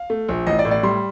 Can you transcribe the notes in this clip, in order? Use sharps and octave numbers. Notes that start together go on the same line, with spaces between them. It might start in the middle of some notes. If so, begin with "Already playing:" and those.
Already playing: F5
A3
A#1
A1 D#5
D5
A2
D5
G3 C6